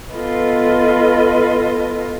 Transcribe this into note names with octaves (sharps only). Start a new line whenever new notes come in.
B3 F4 A4 B4 D#5